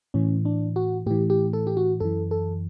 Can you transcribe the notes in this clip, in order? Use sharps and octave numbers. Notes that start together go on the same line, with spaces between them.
A2 E3 C#4
D4
F#4
A2 E3 G4
G4
A4
G4
F#4
F#2 E3 A4
A4